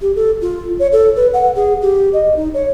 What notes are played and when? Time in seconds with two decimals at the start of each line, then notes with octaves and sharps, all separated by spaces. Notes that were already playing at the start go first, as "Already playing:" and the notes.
0.01 G4
0.16 A4
0.41 F4
0.79 C#5
0.92 A4
1.16 B4
1.33 F#5
1.56 G#4
1.82 G4
2.13 D#5
2.36 D#4
2.54 C#5